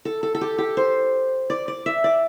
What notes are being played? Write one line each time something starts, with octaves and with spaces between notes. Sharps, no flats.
A4
A4
A4
G4
G4
C5
D5
D5
E5
D5